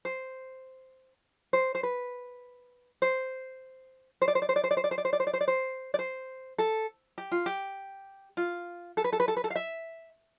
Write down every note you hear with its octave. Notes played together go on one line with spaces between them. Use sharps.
C5
C5
C5
B4
C5
C5
D5
C5
D5
C5
D5
C5
D5
C5
D5
C5
D5
C5
D5
C5
D5
C5
D5
C5
D5
C5
A4
G4
F4
G4
F4
A4
B4
A4
B4
A4
B4
A4
F5
E5